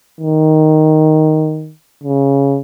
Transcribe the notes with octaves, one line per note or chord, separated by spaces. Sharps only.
D#3
C#3